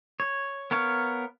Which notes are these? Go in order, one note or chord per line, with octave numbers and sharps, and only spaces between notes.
C#5
B3 A#4 C#5 F5